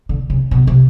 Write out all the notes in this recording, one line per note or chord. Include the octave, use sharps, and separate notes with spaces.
D3
C#3
B2
C3